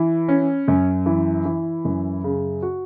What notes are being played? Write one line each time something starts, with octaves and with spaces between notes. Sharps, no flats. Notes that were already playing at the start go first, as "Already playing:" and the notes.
Already playing: E3
C#4
F#2
E3
E3
F#2
C#3
F#4